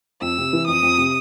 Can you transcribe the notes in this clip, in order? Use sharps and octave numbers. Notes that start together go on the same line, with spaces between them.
F2 E6
C3
E3
F2 D#6
F2
C3